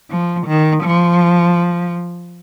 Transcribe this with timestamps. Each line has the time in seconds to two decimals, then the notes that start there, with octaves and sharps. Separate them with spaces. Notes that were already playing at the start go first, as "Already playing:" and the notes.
0.11 F3
0.47 D#3
0.83 F3